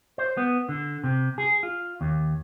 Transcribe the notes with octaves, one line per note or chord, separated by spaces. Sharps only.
C5
B3
D3
C3
G#4
F4
D#2